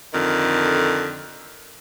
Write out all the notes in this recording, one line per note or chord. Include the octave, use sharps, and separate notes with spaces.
F2 D3 D#3